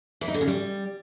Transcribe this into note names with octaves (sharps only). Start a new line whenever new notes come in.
E3
D#4
D3
C#3
G3